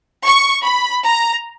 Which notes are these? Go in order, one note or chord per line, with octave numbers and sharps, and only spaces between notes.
C#6
B5
A#5